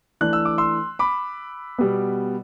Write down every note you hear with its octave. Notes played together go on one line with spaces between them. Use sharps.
E3 A3 D4 F#6
E6
D6
C6 E6
B5 D6
B2 G3 B3